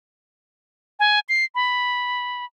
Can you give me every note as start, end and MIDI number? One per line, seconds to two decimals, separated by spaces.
1.00 1.20 80
1.29 1.45 96
1.55 2.45 83